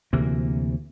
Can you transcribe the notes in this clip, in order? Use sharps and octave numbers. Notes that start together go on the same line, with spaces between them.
D2 C3 E3 A#3